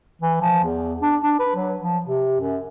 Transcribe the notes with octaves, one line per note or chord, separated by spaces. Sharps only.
E3
F3
E2
D4
D4
B4
F#3
F3
C3
F#2